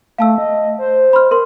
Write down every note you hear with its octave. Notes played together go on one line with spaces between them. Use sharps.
A3 F5 A5 E6
D#5
C5
B5 C6 F6
A#4 C6